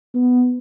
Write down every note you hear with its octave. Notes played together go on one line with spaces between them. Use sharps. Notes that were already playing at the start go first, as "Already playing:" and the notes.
B3